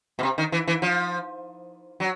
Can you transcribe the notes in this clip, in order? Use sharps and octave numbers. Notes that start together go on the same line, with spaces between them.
B2
C3
D#3
E3
E3
F3
F#3